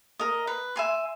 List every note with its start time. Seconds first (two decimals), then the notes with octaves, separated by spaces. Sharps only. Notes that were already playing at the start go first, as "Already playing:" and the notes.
0.19 A#4 D#5
0.47 B4
0.76 E5 G#5 C6